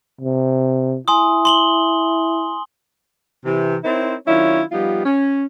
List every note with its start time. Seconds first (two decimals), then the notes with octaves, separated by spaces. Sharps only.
0.21 C3
1.08 E4 G#5 C6 D#6
1.45 C6 F#7 G7
3.45 C3 E3
3.84 C4 D#4 E4 A#4 C5 C#5
4.27 D#3 F#3 C#4 D4 E4 F4
4.72 F3 G3 B3 D#4 F4 G4
5.05 C#4